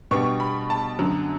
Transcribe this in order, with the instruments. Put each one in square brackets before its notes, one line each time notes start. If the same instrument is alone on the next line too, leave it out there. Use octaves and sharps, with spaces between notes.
[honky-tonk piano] B2 G3 B3 D4 C#6
B5
A5
F#2 D3 F#3